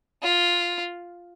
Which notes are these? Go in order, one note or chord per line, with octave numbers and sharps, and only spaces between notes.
F4